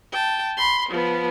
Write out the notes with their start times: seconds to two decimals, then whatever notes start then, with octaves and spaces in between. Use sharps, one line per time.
0.12 G5 A5
0.58 B5 C6
0.89 F3 B3